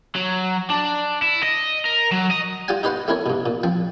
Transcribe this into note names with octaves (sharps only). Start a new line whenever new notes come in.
F#3
D4
E4
D#5
A#4
F#3
D#5
F4 G4 D5 F#5 G#5
D#4 G4 B4 C5 F5 F#5
A3 C4 E4 A#4 C#5
G2 B2
A#2
F3 C4